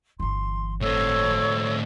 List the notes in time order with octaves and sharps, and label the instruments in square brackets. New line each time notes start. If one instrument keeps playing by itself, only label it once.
[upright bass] G1 E3 [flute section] C6
[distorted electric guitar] A2 C4 [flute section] A4 C#5 E6